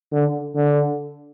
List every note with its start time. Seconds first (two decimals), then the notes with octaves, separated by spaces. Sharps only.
0.12 D3
0.55 D3